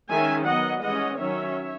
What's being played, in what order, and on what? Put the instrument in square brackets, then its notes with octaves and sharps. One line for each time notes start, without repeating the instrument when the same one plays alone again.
[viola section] D#3 G#3 C#4 E5 G#5
F#3 B3 D#5 F#5
E3 G#3 C#4 D#5 F#5
D#3 F#3 C#4 C#5 E5